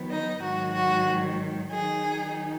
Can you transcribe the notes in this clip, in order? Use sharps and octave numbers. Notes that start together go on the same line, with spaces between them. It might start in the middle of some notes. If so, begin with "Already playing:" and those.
Already playing: D#3 F#3 B3
D#4
G#2 D#3 F#3 F#4
F#4
D#3 F#3 D#4 G#4